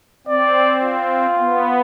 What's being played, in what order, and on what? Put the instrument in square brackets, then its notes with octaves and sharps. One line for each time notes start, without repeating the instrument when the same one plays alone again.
[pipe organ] C4 [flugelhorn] D5
[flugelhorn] F4
[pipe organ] B3